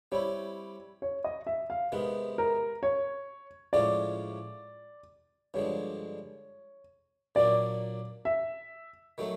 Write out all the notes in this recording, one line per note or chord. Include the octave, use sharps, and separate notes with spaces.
G3 C4 E4 C#5
C#5
D#5
E5
F5
C3 D#3 G#3 B3 B4
A#4
C#5
A2 F3 G#3 C#4 F4 D5
G2 D3 F3 G#3 C#5
A#2 F#3 A#3 D4 D5
E5
D#3 F#3 A3